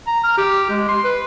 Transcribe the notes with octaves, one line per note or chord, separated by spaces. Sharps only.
A#5
F6
G4
G#3
C6
B4